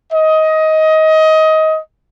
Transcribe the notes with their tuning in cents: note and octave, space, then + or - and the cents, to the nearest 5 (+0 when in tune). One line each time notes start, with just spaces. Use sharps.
D#5 +20